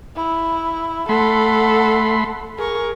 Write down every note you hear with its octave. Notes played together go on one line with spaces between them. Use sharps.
E4
A3 A4 F#5 B5 C6
G#4 A#4 C#6